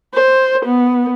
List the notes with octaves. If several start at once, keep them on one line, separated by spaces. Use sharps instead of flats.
C5
B3